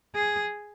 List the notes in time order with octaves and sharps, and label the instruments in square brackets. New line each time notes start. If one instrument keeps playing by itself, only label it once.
[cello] G#4